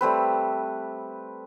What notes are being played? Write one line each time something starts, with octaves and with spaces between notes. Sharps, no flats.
G3 A3 C4 B4